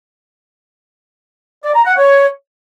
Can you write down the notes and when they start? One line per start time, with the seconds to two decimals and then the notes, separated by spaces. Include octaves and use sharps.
1.64 D5
1.75 A#5
1.86 F#5
1.97 C#5